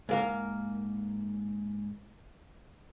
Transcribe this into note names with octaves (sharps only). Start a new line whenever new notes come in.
G#2 A#3 A#4